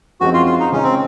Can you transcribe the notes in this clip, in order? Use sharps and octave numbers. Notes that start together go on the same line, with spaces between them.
F#2 F3 G#3 C4 D#4 F#4
F4
F4
D#4
C#3 G#3 C#4 D#4
C4